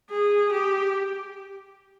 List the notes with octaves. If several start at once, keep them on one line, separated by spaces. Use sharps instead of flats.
G#4
G4